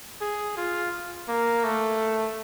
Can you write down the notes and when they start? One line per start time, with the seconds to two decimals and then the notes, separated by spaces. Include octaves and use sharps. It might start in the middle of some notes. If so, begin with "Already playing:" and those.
0.21 G#4
0.57 F4
1.28 A#3
1.64 A3